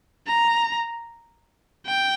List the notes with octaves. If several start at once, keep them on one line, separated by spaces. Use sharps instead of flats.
A#5
G5